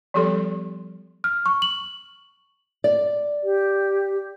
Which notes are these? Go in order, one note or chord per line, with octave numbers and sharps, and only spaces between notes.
F3 G3 B3 G4 A4 C6
F6
C#6
F#7
D5
G4